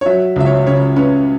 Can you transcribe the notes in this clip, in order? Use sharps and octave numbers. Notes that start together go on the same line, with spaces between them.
C#5
F#3 E5
C#2 E5
C#5
C#3 C#5
C#4 B4